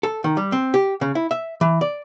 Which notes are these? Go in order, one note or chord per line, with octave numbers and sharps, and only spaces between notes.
A4
D#3
G3
C4
G4
C#3
E4
E5
E3
D5